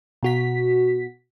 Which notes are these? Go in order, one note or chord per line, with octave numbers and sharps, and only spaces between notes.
B2 F#4 B6